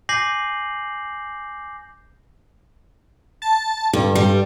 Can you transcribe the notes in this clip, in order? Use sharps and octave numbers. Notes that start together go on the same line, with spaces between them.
G#5 D6 G6 A#6 C7 F#7
A5
G2 D3
G3